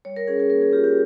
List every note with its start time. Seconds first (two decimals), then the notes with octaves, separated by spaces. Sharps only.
0.05 G3 C#5
0.16 A#4
0.27 C#4 G#4
0.40 G#4
0.50 A#3 A#4
0.62 G#4
0.73 F4 G4
0.84 G4